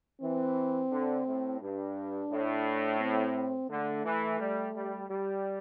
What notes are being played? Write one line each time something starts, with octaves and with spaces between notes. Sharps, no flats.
E3 C4
D3
A2
G2 D4
A2
C4
D3 A3
E3
G3
G3
G3